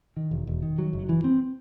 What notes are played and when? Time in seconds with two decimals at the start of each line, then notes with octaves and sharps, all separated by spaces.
0.17 D#3
0.31 E1
0.47 E1
0.63 D#3
0.78 F#3
0.93 F#1
1.09 E3
1.24 C4